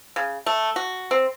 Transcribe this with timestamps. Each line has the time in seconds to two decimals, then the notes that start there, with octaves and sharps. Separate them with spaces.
0.16 C#3
0.46 A3
0.76 F#4
1.11 C4